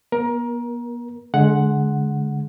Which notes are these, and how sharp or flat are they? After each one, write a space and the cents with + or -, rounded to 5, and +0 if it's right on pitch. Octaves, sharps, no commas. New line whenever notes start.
B3 -45 A#4 +25
D3 -15 G#3 +20 F#5 +0